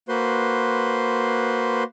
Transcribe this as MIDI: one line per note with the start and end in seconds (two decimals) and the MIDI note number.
0.09 1.83 58
0.09 1.83 66
0.09 1.83 71
0.09 1.83 72
0.09 1.83 84